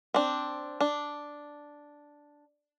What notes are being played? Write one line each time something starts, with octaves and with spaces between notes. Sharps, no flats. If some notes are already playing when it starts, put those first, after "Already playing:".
C4 D4
D4